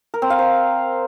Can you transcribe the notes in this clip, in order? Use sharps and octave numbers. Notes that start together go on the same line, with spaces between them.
A#4
C4
F5
C5